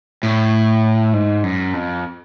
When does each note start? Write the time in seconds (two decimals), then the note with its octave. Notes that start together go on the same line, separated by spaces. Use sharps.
0.23 A2
1.13 G#2
1.44 F#2
1.74 F2